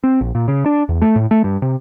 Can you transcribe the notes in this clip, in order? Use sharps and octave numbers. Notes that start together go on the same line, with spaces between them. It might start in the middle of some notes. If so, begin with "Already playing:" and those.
C4
A#1
A#2
C#3
D4
E2
A3
A2
A3
G2
C3